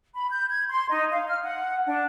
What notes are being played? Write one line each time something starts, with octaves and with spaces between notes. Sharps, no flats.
B5
G6
G#6
C6
D#4
F5
F6
F#5
D4